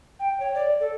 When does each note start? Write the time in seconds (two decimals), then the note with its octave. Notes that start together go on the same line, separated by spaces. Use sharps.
0.19 G5
0.40 C#5
0.55 D5
0.80 A4